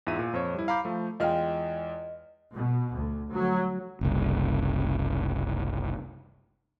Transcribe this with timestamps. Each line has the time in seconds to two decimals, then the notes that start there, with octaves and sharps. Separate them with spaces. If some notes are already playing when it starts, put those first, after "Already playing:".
0.07 E2 G#2 F4 E5 D#7
0.19 A#2
0.33 F2 C5 C#5
0.54 G3 E4
0.68 F5 A#5 B5 D6 G6
0.85 F3 A3
1.20 E2 G#3 F4 D#5 G5 F6
2.51 B2
2.95 D2
3.31 F#3
4.01 F#1 C2